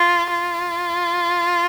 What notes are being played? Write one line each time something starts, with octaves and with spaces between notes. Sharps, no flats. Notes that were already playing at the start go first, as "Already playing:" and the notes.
Already playing: F4
F4